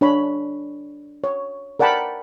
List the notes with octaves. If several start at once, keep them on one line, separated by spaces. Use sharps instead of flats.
D4 C#5 B5
C#5
A#4 D5 F#5 G5 A5 B5